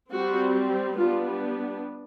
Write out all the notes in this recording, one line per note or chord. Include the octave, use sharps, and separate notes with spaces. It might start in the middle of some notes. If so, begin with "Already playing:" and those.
G3 C4 F#4
G3 B3 D4 F4